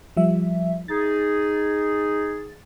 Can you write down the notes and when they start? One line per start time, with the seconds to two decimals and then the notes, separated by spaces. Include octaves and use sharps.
0.17 F3 G3 E5
0.88 D#4 G#4 A6